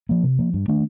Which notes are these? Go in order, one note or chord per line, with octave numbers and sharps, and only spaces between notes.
F3 A#3
C3
F3 A#3
G2
D#3 A3 D4